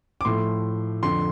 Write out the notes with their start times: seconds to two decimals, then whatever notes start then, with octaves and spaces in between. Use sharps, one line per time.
0.21 D6
0.25 A2 F3 A3 C6
1.03 F2 D3 F3 C6